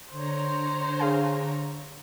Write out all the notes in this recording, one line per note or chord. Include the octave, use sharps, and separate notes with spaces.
D3 C5 C#5 A#5
G#4 F5 G#5